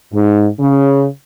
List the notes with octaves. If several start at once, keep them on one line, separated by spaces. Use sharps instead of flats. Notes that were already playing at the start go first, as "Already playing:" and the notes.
G#2
C#3